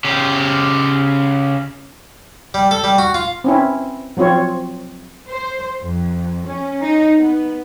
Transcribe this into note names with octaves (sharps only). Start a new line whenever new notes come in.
C#3 G4
G3
A4
G3
F#4
F4
C4 C#4 E4
F3 F#3 C4 F4 C#5
C5
F2
C#4
D#4
B3